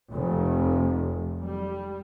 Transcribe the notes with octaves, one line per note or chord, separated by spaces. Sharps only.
F1
G3